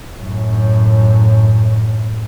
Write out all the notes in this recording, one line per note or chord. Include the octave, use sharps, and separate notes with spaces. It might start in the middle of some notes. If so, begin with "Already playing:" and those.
F#2 A2